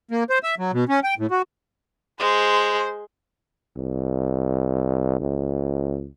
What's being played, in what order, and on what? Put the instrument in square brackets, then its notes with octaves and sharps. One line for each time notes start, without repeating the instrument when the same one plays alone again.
[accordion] A#3
C5
E5
F#3
B2
C#4
G5
A2
F#4
[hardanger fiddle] G#3 [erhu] C5
[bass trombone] C2
C#2